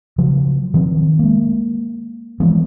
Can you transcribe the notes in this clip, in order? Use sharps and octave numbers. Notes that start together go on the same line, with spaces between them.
C#3 F3 F#3
D#3 F3 C4
G#3 A#3
E3 F3 G#3 B3